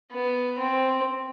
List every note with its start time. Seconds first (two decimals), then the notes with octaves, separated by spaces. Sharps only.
0.12 B3
0.59 C4